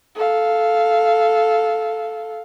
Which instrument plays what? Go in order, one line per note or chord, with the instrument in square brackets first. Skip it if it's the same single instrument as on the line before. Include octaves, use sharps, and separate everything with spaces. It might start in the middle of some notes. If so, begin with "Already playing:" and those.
[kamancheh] A4 F5